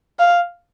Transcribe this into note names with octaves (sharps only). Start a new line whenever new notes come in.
F5